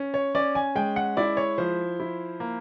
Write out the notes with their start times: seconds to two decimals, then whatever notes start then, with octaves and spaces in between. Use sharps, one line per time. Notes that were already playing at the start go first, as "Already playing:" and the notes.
Already playing: C#4
0.14 C#5
0.35 C#4 D5
0.55 G#5
0.75 G#3 G5
0.96 F#5
1.17 E4 D5
1.37 C#5
1.58 F3 C5
2.00 E4
2.40 A#3